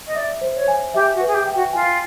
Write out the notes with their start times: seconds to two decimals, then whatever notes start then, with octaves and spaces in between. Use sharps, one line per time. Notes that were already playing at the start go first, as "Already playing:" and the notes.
0.06 D#5
0.15 D5 E5
0.41 C5
0.55 C#5
0.68 G#5
0.94 G4 E5
1.14 F#4
1.21 B4
1.27 G#4
1.34 G4
1.47 G5
1.54 F#4
1.73 F4 G#5